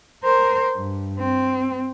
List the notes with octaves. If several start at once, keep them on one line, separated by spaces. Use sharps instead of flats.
A#4 C5
G2
C4